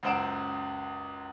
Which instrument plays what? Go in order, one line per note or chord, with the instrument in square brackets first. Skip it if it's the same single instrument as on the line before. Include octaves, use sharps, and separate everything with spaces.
[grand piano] C#2 F#2 C5 F#5 D7 E7